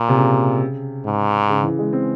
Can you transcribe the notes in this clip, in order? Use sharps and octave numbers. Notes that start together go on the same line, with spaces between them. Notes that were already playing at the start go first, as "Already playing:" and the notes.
Already playing: A#2
C3
C#3
G#2
C#3
E3
G#3
C4